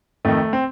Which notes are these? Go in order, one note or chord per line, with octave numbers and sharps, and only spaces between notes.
F2 D#3 A3
C4